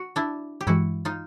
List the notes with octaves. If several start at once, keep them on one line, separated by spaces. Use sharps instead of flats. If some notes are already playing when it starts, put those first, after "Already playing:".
Already playing: F#4
D4 E4
G4
G2 E3 G#3 E4 F#4
D#4 F4